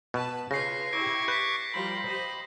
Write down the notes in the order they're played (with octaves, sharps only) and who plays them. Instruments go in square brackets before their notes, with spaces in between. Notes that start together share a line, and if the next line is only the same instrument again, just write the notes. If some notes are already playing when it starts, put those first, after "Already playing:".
[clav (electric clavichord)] B2 [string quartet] B4 A5
[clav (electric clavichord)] C#3 [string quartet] F4 B4 C#5 [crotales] A#6 C7
[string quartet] E4 G4 [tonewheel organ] C#6 D6 G#6 [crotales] A#6
[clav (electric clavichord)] B4 [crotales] G6 B6 [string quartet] A6
[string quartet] F3 G3 A#4 [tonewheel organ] B5
[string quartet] G4 C5 D#5